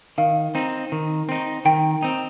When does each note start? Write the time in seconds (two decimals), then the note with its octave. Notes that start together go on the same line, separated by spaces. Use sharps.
0.18 D#3 F5
0.55 C4 D#4
0.92 D#3
1.29 C4 D#4
1.65 D#3 G5
2.02 C4 D#4